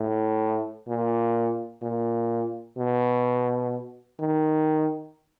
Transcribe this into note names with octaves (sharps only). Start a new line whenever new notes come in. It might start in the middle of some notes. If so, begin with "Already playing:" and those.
Already playing: A2
A#2
A#2
B2
D#3